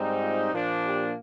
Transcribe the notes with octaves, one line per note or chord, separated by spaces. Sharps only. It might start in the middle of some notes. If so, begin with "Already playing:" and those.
Already playing: G#2 G3 C4 D#4
F4
A#2 F3 A#3 D4
G4